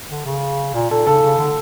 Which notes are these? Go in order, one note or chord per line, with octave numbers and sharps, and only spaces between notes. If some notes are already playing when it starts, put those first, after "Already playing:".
D3
C#3
A#2
A#2 A4
C#3 A4
C#3
D3